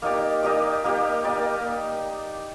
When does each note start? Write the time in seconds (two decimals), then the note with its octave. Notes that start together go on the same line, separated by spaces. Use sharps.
0.02 A#3 D#4 G4 D5
0.43 A#3 D#4 G4 D5
0.84 A#3 D#4 G4 D5
1.24 A#3 D#4 G4 D5